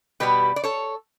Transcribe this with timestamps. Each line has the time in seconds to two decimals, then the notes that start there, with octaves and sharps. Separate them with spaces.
0.20 B2 G3 B3 G4 B4
0.56 D5
0.64 A4 C#5